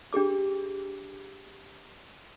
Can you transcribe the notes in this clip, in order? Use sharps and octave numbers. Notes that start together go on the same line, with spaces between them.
D4 G4 G#4 D6